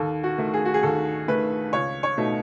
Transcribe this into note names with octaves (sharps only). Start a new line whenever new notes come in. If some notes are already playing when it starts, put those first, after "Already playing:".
Already playing: D#2 A4
F#4
D#3 A3
G#4
F#4
G#4
D#2 A4
D#3 A3 B4
C#2 C#5
C#5
B2 A3 D#4